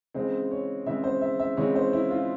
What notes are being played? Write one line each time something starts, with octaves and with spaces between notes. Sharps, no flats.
C#3 E3 G#3 C4 C5
C#5
C#3 E3 G#3 C4 E5
C5
E5
E5
C#3 E3 G#3 C4 C#5
C5
E4
F4